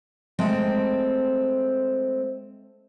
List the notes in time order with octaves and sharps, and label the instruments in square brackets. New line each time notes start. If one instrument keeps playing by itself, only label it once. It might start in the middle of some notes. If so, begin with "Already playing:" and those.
[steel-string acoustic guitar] G#3 A3 C4 G5